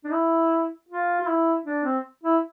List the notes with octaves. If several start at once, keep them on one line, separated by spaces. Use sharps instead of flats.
D4
E4
F4
F4
E4
D4
C4
E4